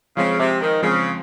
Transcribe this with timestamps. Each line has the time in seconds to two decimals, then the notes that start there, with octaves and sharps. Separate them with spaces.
0.16 C#3 F3 G#3 C4
0.38 C3
0.60 D#3
0.82 C#3 F3 G#3 C4